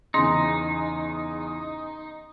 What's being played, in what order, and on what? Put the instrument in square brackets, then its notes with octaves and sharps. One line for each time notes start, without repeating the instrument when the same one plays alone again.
[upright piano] E2 C#3 [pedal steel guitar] D#4 [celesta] C6